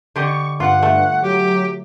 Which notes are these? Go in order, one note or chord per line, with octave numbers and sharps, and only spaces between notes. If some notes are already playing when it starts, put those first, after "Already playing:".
D3 G4 D#5 C#6
G2 F4 F#5
A3
F#3 G4